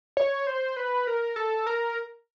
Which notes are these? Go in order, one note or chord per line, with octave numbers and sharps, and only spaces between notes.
C#5
C5
B4
A#4
A4
A#4